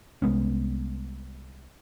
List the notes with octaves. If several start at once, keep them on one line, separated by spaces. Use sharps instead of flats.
C2 G#3 B3 C#4